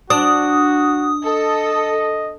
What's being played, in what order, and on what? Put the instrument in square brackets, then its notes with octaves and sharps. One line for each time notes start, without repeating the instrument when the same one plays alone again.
[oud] D4 [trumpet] F#4 [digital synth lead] D#6
[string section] A4 [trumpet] D#5